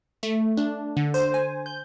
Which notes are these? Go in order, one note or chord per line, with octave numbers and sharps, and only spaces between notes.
A3
D4
D3
C5
G#5
G6